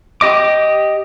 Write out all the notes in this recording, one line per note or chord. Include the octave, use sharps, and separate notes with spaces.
G4 D#5 D6